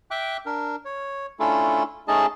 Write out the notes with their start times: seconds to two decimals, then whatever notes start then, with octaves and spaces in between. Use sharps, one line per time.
0.11 E5 G5 D6 F#6
0.46 D4 A#4
0.85 C#5
1.40 A3 C#4 D4 E4 F4 A4
2.08 A3 C#4 D#4 G#4 D#5 A5